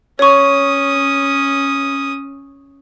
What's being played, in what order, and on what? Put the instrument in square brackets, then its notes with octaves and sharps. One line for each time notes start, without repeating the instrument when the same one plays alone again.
[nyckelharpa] C#4 D#6 [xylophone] C#5 C#6